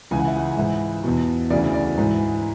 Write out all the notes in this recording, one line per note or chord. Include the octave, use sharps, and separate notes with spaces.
C#2 C#3 E3 G#5
F#5
E5
F#5
G#2 E3 E5
E2 B2
D2 C#3 E3 D5
D5
G#2 E3